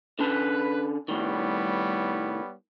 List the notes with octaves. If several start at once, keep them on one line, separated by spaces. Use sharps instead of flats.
D3 C#4 B4 A5
C2 A2 D#3 G3 B3 C#5